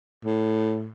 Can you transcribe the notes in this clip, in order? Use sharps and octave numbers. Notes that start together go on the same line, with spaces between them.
A2